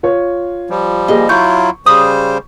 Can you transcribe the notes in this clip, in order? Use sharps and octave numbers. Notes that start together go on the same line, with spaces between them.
F4 C#5
F3 G3
A#3 G4 G#4 D#5
F#3 E4 F4 C#6 G6
C#3 G3 C5 D#6